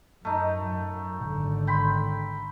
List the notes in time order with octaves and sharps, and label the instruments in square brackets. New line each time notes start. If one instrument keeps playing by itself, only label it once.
[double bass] F#2 [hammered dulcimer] A3 D#4
[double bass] G#1 D3
[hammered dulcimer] G5 B5 C6